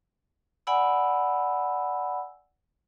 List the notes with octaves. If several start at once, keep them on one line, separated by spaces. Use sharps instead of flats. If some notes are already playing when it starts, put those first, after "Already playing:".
D5 F#5 G#5 B5 E6